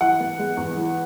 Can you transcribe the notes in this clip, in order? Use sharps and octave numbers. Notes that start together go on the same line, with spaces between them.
E3 F#5
B3
G#3
E2
E3